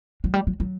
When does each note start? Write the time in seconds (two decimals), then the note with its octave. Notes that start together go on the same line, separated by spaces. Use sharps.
0.24 F#3
0.34 G3
0.47 F#3
0.60 F#3